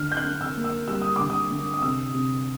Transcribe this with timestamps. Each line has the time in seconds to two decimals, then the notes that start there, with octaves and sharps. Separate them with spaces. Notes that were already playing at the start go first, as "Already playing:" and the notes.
Already playing: D3 F6
0.12 G6
0.17 F#6
0.25 D4
0.41 E6
0.56 A#3
0.64 E6
0.88 G3 E6
1.02 D#6
1.16 D3 D6
1.30 D#6
1.51 D3
1.74 D#6
1.82 C3 E6
2.14 C3